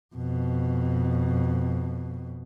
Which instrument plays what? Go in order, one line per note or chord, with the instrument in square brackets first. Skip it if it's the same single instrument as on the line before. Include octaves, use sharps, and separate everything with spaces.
[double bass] F2 B2